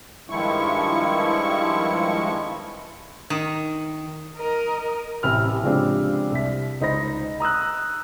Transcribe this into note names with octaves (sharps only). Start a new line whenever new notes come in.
G2 D#3 F3 G#3 E4 C#6
D#3
A#4 D#5
A1 C3 E4 B5 E6 F6
C#3 F3 G#3 C4 D4 G4
C2 B6
C#2 D#4 C5 B5 A#6
A#5 D#6 E6 F#6